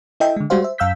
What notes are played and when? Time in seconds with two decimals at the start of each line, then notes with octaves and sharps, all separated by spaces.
0.20 E4 A4 D#5 E5 G5
0.36 D3 G#3
0.50 G3 G#3 F#4 G4 C5 F5
0.62 C5 E5
0.78 F#2 F5 E6 G6 B6